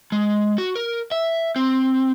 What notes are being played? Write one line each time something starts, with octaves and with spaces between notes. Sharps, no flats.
G#3
F#4
A#4
E5
C4